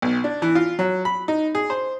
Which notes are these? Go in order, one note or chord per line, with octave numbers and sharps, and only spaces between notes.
B1
D4
E3
F4
F#3
B5
D#4
G#4
C5